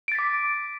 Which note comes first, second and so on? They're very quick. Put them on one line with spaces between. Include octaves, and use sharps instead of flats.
D7 A6 B6 D6